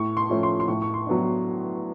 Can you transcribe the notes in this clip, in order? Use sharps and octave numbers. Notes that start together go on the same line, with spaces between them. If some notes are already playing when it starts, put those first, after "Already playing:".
Already playing: A2 C#6
C6
F3 A3 C#4
C6
C6
A2 C#6
C#6
C6
F#3 B3 D4